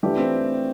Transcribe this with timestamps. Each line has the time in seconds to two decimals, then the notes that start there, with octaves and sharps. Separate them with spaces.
0.03 E3 A3 D4 F4 G4
0.18 C4